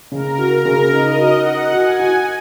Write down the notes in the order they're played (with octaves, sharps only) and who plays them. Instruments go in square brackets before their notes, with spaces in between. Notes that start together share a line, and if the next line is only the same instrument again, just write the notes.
[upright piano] C#3 [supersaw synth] A#4
[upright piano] F#4
[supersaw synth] A#4
[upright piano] C#3
[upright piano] D#4 [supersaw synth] D#5
[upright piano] F#4
[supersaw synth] F#5
[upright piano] F#4
[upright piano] F#4 [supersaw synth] G#5
[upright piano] F#4